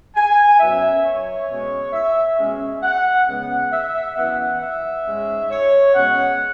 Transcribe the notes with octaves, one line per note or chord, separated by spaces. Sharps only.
G#5
F#2 F#3 B3 E5
C#5
B2 G#3 C#4
E5
B2 G#3 C#4
F#5
C#3 G#3 B3 F#5
E5
F#2 E3 B3 F#5
E5
G#2 G#3 C#4
C#5
B2 G#3 C#4 F#5